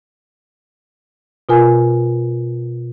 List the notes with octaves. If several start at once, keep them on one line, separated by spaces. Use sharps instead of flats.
B2 F4 A#4 G#5